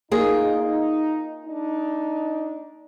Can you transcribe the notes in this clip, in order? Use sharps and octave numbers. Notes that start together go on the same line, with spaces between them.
A#3 D#4 F4 G#4
D#4
D4 D#4